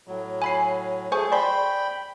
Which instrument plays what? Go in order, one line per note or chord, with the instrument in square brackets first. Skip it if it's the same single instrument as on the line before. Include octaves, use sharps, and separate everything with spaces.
[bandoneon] A2 F#3
[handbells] G#5 B5 C7
[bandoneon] A3 G#4 [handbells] C5 G#5 C#6
[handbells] D5 C6 [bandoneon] G5 B5